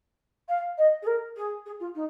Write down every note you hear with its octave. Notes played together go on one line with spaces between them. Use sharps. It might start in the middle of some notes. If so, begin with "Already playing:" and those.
F5
D#5
G#4
A#4
G#4
G#4
F4
D#4